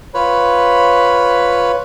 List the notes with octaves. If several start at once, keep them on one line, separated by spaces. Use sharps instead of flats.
F4 B4 C#5 B5